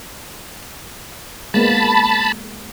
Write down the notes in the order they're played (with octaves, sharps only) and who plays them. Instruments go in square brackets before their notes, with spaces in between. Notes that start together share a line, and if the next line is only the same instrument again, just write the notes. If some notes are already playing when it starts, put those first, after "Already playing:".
[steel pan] G#3 A#3 B3 [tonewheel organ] A5 B5